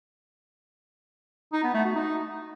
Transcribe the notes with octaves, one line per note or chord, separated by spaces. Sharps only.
D#4
B3
A3
F#4
D#4